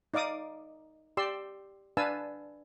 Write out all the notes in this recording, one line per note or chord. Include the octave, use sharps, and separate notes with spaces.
D#4 D5 F5 D6 D#6
G4 D5 C6 E6
D4 B4 F5 G#5 A5 E6